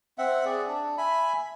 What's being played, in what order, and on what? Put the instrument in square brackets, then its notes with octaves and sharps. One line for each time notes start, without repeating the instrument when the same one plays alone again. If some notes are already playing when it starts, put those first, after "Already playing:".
[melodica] C4 E5 F#5
G#4 D5
D4
E5 G#5 B5